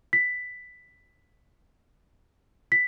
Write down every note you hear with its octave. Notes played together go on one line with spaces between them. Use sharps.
B6
B6